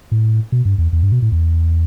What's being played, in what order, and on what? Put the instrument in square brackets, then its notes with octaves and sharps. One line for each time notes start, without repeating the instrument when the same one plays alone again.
[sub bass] A2
B2
G2
E2
E2
G2
B2
A2
E2